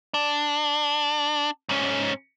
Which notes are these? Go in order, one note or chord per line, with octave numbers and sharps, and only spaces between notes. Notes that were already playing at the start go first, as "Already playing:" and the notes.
D4
G#2 C#4